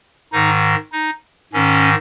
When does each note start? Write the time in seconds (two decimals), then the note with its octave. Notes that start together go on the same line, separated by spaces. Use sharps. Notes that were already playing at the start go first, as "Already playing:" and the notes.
0.33 G#2 D#3 D#4
0.93 D#4
1.53 G#2 D#3 C#4